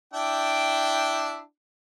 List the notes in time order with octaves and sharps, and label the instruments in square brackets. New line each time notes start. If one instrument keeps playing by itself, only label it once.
[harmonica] D4 E4 G5